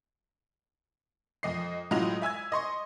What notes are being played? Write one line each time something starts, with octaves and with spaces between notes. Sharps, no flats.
F2 D#5 C7
A2 F#3 G#3 F4 D#5 F7
E5 G#5 E6 G#6
D#5 C6 C#6